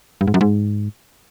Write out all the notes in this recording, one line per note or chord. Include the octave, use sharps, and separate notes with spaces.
G2
G#2
F#2
G#2